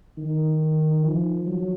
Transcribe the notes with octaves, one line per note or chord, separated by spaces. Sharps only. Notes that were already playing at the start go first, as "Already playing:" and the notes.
D#3
F3
F#3